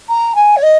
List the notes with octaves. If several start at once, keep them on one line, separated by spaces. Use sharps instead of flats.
A#5
G#5
C#5
D#5